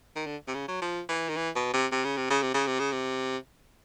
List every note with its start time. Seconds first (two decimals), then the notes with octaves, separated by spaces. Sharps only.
0.16 D#3
0.26 D3
0.47 C3
0.54 C#3
0.68 F#3
0.82 F3
1.09 E3
1.29 D#3
1.36 E3
1.56 B2
1.73 C3
1.92 C3
2.05 C#3
2.17 C3
2.30 C#3
2.42 C3
2.54 C#3
2.67 C3
2.79 C#3
2.92 C3